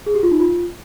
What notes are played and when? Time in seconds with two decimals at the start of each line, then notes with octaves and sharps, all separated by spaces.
0.06 G#4
0.15 G4
0.23 F4
0.31 D#4
0.40 F4